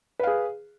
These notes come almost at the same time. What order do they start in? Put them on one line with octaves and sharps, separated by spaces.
B4 F5 G#4